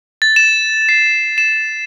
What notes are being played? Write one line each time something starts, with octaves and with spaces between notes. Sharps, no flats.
A6
E7
C7
E7